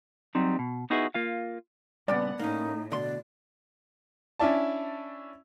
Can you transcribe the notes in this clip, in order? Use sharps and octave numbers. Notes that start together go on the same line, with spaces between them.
F#3 G3 C4 D#4
B2
B3 D#4 E4 F#4 G#4 B4
A#3 F4 F5
G2 A#2 C#3 B3 D5 F#5
A2 A#3 C#4 D#4
B2 D3 D5 C6
C#4 D4 E4 D5 A5